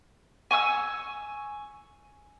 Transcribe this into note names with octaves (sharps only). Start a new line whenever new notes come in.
G#5 C#6 D#6 E6